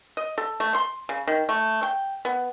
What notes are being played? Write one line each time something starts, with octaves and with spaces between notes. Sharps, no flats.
D#5
A4
A3
C6
C#3
D#3
A3
G5
B3